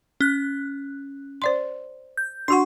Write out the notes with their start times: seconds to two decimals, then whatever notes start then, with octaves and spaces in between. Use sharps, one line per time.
0.21 C#4 F#6
1.42 C5 D5 C6
2.17 G6
2.48 D4 F#4 F#5 C6 C#6